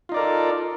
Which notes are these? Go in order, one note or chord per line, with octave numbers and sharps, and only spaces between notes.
D#4 F4 A4 A#4 D5